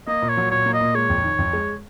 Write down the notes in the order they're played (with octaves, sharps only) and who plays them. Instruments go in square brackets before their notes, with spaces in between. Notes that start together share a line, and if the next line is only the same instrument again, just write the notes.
[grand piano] A#3 [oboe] D#5
[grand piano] A#2
[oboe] C#5
[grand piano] F#3
[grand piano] A#2 [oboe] C#5
[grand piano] A#3
[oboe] D#5
[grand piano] A#2
[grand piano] G#3 [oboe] C#5
[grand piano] F2
D#3
F2
G#3